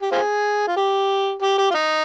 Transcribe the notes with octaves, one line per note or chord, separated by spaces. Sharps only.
G4
C4 F4 G#4
F4
G4
G4
G4
F4
D#4